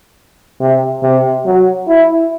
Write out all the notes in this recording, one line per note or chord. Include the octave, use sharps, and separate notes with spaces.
C3
C3
F#3
E4